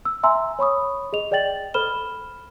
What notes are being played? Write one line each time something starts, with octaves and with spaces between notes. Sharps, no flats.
E6
E5 G#5 A#5 C6 E6
C#5 B5 C#6 D#6
G#4 D#5 F7
G#4 D5 D#5 G5 A6 F#7
A4 C5 B5 F6 E7 G7